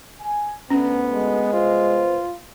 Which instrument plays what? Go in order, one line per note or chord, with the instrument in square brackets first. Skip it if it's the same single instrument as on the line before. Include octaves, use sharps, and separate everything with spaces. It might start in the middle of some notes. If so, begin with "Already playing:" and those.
[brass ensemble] G#5
[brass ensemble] D2 [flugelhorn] B3 [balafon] C#4
[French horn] G#3
[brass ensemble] C2 B3 C5 [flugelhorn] F4